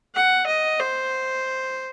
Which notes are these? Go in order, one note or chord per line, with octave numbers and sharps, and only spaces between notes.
F#5
D#5
C5